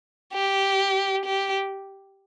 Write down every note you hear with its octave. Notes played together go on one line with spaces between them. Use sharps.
G4
G4